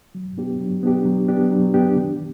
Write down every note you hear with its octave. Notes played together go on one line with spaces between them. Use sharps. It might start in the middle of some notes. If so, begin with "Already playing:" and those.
F#3
B3 D4 G4
F#3
B3 D4 G4
F#3
B3 D4 G4
F#3
B3 D4 G4
D#3